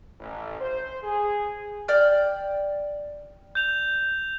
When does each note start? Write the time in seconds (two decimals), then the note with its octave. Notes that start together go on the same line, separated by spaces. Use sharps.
0.19 A1
0.61 C5
1.03 G#4
1.88 D5 G5 F6
3.55 G6 F7